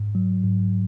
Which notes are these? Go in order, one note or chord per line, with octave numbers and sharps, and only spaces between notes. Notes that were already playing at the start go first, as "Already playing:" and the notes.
Already playing: G#2
F#3
G#2